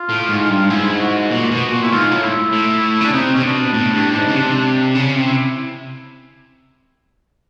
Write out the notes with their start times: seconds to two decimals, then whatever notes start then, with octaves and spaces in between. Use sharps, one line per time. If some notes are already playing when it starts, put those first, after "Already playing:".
Already playing: F4
0.09 A2
0.29 G#2
0.50 G2
0.69 G#2 E4
1.00 F#4
1.31 A#2
1.51 B2
1.71 A#2
1.83 E4
1.91 G#2 F4
2.11 A2
2.22 E4
2.52 A2
3.01 C#3 D4
3.13 C3 D#4
3.34 C3 C#4
3.43 B2 D4
3.74 A2
3.94 G2
4.14 G#2
4.27 C#3
4.34 C3
4.95 C#3
5.15 C3
5.26 E4